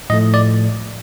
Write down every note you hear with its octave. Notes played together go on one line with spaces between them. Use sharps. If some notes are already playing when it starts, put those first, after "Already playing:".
A2 F3 A3 D#5
D5